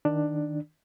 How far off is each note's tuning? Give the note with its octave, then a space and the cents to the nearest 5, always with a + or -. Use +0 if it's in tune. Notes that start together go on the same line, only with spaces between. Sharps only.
D#3 +0 D4 +10